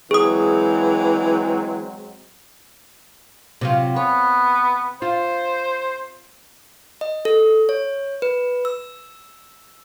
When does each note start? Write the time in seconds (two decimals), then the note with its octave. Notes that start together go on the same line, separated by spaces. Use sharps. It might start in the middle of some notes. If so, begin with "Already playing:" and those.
0.11 E3 F#3 G#3 C4 G#4 D#6
3.61 C3 F#3 F4
3.96 B3 C#5
5.02 F4 C5
7.01 D#5
7.25 A4
7.69 C#5
8.22 B4
8.65 E6